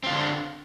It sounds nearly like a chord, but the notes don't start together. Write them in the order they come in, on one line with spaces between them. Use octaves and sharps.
C4 F4 D3 D4